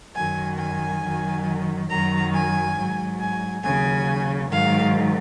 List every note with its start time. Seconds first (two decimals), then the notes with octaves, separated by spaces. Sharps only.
0.15 F#2 D#3 F#3 G#5
0.58 G#5
1.01 F#2 D#3 F#3
1.89 F#2 D#3 F#3 A#5
2.32 G#5
2.76 G#2 F#3
3.19 G#5
3.63 D#2 C#3 F#3 G#5
4.50 G#2 D#3 F#3 F5